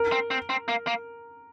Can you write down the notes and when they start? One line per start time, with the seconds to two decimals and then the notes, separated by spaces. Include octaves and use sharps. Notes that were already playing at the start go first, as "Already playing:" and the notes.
Already playing: A#4
0.12 C4
0.31 C4
0.50 C4
0.68 A#3
0.87 A#3